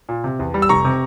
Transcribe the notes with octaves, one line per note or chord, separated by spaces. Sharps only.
A#2
C3
E2
G3
E6
F1 A#5 C#6
C3